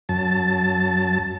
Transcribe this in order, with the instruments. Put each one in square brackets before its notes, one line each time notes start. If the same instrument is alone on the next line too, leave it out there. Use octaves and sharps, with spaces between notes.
[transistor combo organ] F#2 A5